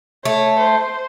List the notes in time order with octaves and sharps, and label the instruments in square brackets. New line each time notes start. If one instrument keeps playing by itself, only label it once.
[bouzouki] A3 [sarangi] C#5
[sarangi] C5